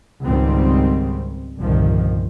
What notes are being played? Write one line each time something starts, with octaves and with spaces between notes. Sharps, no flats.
C#2 G#2 D#3 G3 C4
G1 C2 A#2 D#3 F3